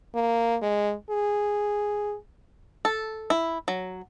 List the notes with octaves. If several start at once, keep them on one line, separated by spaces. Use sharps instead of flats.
A#3
G#3
G#4
A4
E4
F#3